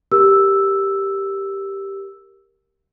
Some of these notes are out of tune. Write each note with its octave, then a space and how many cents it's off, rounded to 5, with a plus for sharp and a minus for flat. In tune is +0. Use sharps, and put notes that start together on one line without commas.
G4 +0 A#4 +0 E6 +0